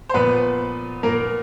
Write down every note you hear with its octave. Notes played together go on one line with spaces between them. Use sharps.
C5
A#2 F3 B3 B4
A#2 F3 A#3 A#4